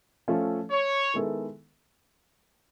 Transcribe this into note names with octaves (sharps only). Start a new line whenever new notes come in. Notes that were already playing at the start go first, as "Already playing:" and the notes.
F3 A3 C#4 F4 A4
C#5
D#3 G#3 B3 E4 A4